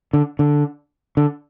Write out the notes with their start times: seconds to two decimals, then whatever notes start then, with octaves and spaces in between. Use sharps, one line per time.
0.13 D3
0.39 D3
1.17 D3